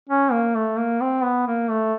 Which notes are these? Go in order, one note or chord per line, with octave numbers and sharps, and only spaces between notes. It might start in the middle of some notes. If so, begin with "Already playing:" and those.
C#4
A#3
A3
A#3
C4
B3
A#3
A3